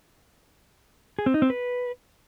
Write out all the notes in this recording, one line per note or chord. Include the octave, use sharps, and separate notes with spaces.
G#4
C4
D#4
C4
B4